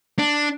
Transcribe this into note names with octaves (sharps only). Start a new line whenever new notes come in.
D4